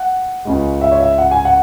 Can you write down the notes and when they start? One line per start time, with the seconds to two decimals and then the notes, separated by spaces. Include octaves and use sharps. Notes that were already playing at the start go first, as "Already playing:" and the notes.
Already playing: F#5
0.45 C#2 C#3 G#3
0.81 E5
0.91 C#5
1.00 E5
1.18 F#5
1.31 G#5
1.45 F#5